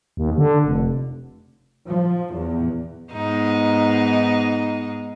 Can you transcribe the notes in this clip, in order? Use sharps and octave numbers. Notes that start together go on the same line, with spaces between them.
D#2
D3
F1
F3
E2
G#2 B3 D#4